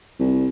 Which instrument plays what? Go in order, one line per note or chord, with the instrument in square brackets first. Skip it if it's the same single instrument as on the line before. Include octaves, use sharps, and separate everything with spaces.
[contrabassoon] C2